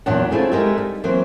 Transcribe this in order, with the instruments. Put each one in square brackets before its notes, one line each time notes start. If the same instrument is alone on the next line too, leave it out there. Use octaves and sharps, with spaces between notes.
[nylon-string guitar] E2 A#2 F#3 D4 F#5
A3 C4 E4 F4 G#4
G#3 D#4 G4 A#4 E5
G3
E3 F#3 A#3 C4